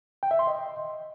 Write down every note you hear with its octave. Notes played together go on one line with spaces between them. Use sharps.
G5
E5
C6
D#5